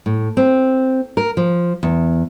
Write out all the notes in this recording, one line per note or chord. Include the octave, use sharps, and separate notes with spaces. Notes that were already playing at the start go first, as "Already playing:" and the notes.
A2
C4
A#4
F3
E2